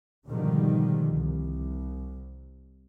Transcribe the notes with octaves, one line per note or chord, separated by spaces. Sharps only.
G#2 B2 D3 D#3 F3 G3
C2